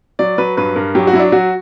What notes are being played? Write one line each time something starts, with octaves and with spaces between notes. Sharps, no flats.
F#3 D5
F#3 B4
G2 B4
G2 A#4
F#3 G4
F#4
F#3 E4
D4
F#3 F#4